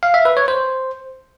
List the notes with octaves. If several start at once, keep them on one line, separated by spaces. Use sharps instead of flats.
F5
E5
B4
C#5
C5